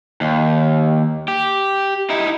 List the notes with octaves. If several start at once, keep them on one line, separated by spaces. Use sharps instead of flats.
D#2
G4
D#4 E4